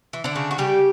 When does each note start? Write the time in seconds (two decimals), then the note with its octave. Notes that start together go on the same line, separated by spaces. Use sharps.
0.13 E3
0.24 D3 D4
0.36 C#3
0.51 F#4
0.58 C#3 G3 G4